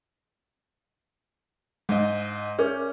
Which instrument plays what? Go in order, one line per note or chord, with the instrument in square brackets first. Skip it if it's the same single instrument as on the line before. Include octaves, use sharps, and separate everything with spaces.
[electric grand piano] G#2 D#5 [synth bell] G#3
[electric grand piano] C#4 [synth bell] G#4 A#4 D6